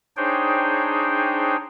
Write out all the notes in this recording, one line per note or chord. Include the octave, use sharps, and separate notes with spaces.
D4 D#4 G#4 C5 C#5 G5